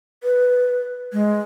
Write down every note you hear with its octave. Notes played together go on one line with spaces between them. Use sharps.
B4
G#3